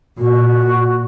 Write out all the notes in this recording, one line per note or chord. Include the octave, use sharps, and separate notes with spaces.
A#2 F#4